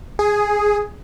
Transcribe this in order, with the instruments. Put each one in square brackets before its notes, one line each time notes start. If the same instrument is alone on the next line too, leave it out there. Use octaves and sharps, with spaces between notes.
[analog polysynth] G#4